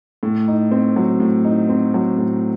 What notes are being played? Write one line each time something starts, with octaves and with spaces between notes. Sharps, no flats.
A2
D#4
C4
F#3
A2
D#4
C4
F#3
A2